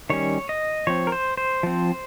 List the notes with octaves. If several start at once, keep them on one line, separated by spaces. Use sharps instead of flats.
D#3 G3 C#4 C#5
D#5
F3 C4 C#5
A#4
C5
C5
F3 C4